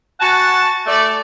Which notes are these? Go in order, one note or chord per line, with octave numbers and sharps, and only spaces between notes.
F#4 F#5 G#5 A5
A3 D5